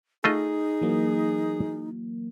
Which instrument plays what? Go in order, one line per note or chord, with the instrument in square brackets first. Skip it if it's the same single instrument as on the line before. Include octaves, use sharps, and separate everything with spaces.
[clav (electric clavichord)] A3 F4 D#5 [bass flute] D#4 [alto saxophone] G#4
[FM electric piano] E3 F#3 A#3